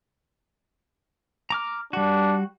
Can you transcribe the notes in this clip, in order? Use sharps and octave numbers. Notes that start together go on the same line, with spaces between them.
A#5 D6 F6
G3 D4 F#4